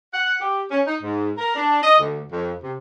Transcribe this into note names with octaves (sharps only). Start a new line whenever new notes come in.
F#5
G4
C#4
D#4
G#2
A#4
D4
D#5
D2
F2
C3